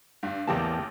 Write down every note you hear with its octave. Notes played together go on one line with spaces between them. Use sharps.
G2
A1 E2 E3 A#3 G4 A5